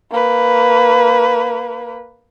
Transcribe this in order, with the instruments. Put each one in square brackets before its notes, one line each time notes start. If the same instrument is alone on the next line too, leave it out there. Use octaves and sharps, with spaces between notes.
[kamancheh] A#3 B4